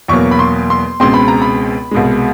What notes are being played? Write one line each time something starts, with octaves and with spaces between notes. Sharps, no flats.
E2 B2 F#3 A#3 C#6
B5
C6
C6
C#2 B2 G#3 C4 C6
B5
A#5
B5
C2 B2 G#3